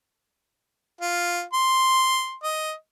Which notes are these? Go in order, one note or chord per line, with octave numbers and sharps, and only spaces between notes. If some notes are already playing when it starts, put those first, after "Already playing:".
F4
C6
D#5